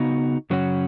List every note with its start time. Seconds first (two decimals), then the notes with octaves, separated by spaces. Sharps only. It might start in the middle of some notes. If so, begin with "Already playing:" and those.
Already playing: C#3 B3 D#4 F#4
0.50 F#2 C#3 F#3 C#4 F#4